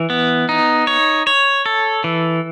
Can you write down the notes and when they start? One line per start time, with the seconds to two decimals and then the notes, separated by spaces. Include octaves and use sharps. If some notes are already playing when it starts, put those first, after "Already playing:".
Already playing: E3
0.10 B3
0.49 D#4
0.87 C#5
1.27 C#5
1.66 A4
2.04 E3